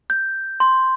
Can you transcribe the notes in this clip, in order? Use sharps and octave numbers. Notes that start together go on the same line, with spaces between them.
G6
C6